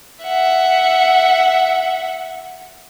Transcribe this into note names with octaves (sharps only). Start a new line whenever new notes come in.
E5 F#5